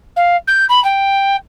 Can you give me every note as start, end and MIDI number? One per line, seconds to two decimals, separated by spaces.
0.16 0.36 77
0.47 0.65 91
0.69 0.82 83
0.84 1.36 79